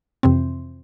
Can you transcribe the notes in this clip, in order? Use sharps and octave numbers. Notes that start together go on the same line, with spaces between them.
F2 C3 E3 C4